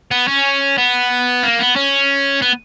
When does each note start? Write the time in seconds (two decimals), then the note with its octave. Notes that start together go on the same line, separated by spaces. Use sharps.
0.11 B3
0.28 C#4
0.78 B3
1.43 A#3
1.59 B3
1.76 C#4
2.42 B3